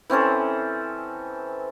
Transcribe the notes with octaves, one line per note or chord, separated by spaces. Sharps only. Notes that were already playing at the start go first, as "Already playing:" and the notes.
E3 C4 C#4 A4